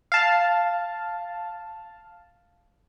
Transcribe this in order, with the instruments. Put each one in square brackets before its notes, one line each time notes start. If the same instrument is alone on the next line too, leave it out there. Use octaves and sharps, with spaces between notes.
[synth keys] F5 A5